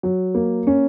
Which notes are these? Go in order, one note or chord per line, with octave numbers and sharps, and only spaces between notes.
F#3
A#3
C#4